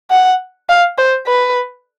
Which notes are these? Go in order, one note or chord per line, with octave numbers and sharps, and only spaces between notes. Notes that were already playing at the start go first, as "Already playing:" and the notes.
F#5
F5
C5
B4